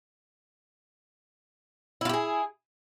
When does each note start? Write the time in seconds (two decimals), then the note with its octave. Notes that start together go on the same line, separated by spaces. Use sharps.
2.01 E4
2.05 F4
2.09 G4
2.14 G#4